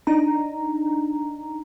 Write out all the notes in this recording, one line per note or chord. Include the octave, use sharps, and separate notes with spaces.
D4 D#4 A#5